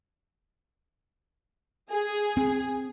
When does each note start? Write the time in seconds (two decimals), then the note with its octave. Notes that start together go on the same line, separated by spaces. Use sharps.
1.91 G#4
2.37 C4